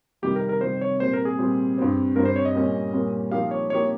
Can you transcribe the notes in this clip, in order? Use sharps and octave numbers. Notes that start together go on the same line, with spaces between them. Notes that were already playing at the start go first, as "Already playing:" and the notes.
F2 C3 D#3 G3 G4
A#4
A#4
F2 C3 D#3 G3 C5
C#5
A#2 G3 C4 C5
A#4
G#4
A#2 G3 C4
G2 G3 C4
G2 G3 C4 A#4
C5
C#5
D#5
A#2 G3 C#4
A#2 G3 C#4
F3 A#3 D#4 G4 F5
C#5
F3 A#3 D#4 G4 C#5